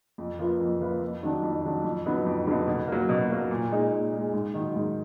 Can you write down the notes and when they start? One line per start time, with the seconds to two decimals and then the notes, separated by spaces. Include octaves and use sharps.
0.18 F2
0.39 F3 A#3 F4 B4
0.61 F2
0.81 F3 A#3 F4 B4
1.01 F2
1.23 D#3 F#3 D4
1.43 F2
1.64 D#3 F#3 D4
1.84 F2
2.05 D3 F#3 B3 D#4
2.26 F2
2.47 D3 F#3 B3 D#4
2.67 B2
2.88 F#3 A#3
3.09 B2
3.30 F#3 A#3
3.51 A#2
3.72 G#3 D#4
3.92 A#2
4.13 G#3 D#4
4.34 G#2
4.54 D#3 F#3
4.75 G#2